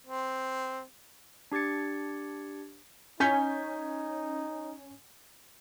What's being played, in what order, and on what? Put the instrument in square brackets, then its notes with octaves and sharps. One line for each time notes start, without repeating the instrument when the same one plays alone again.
[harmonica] C4
[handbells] D4 G4 G#6 A6 C#7
[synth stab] C#4 [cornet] D#4 [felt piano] G#5 G6 B6